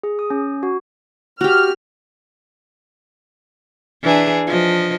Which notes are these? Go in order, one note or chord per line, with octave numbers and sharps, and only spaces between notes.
G#4
D#6
C#4
F#4
F#4 G4 F6
E3 D4 G#4
F3 D#5